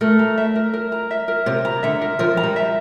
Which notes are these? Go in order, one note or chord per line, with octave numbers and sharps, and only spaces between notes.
A3 A#4
A#5
E5
A#4
A#4
A#5
E5
A#4
C3 A#4
A#5
D3 E5
A#4
F3 A#4
A#5
G3
E5